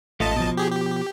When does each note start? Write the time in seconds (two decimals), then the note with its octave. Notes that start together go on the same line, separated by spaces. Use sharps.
0.20 A1 A3 F4 D#5 A5
0.36 B2 F3
0.57 G4 G#4
0.71 G4